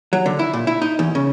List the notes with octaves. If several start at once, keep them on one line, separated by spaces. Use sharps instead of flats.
F#3
D3
E4
A#2
E4
D#4
E2
C#3